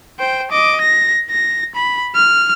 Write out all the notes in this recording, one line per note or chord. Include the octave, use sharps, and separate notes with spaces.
C5 G5
D#5 D6
A#6
A#6
B5
F6